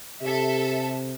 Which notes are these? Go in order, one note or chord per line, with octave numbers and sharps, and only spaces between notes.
C3 G4 A4 E5